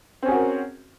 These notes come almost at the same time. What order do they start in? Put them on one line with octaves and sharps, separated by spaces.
C4 C#4 G#4 F#4 A#4